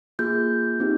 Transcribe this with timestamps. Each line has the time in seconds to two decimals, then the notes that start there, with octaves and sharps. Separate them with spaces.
0.19 A#3 F4 G#4 G6
0.80 C4 D#4 G4